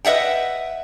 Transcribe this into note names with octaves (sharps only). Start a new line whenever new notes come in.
B4 D#5 E5 F#5 G5